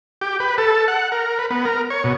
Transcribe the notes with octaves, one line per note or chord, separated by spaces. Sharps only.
G4
B4
A4
F#5
A#4
B4
B3
A#4
C#5
B2